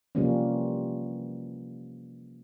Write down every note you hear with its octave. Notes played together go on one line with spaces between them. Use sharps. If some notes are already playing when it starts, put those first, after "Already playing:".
C3 E3 F3 G3 A#3 C#4